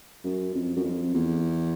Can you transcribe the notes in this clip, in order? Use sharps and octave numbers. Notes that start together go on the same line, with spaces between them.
F#2
F2
F#2
F2
E2